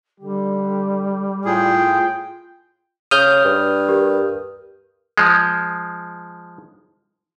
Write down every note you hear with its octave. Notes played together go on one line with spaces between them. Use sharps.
D3 G3 G4
A2 F4 G#4 G5
C#3 D#6 F6 G6
G2
G4 A#4
F3 G#3